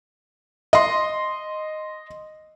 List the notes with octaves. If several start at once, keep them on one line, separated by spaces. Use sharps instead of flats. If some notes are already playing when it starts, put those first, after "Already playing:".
D#5 C6